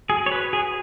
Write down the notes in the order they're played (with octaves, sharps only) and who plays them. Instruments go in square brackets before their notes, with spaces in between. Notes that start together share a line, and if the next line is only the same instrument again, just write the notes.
[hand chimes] F#4 [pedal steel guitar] G#4
[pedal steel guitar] C#5
B4
[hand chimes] F#4 [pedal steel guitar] G#4